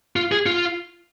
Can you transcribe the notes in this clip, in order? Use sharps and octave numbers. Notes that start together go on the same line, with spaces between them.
F4
G#4
F4